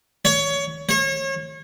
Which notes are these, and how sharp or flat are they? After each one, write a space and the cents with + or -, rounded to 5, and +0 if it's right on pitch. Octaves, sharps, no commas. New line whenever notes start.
C#5 +20
C#5 -35